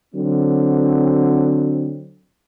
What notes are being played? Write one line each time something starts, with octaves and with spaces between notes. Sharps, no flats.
D3 F#3 C4